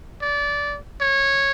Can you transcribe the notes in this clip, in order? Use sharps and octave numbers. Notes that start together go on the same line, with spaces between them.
D5
C#5